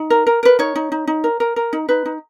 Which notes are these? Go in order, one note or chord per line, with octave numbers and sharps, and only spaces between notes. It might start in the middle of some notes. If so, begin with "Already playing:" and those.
Already playing: D#4
A#4
A#4
A#4 B4
D#4 C#5
D#4
D#4
D#4
A#4
A#4
A#4
D#4
D#4 B4
D#4